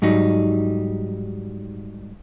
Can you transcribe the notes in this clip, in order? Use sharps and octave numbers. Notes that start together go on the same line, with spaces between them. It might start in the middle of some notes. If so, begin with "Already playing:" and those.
G#2 F#3 G3 D#4